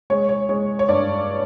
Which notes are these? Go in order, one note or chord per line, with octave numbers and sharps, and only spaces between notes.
G#3 C#5
C#5
G#3 C#5
C#5
G2 D5